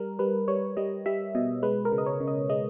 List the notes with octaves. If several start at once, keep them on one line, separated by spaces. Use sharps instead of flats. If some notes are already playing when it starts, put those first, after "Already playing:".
Already playing: G3 A#4
G3 B4
G3 C#5
G3 D#5
G3 E5
B2 D#5
G#3 B4
A#4
C#3
D#5
C#5
C#3
D#5
G#3 D#5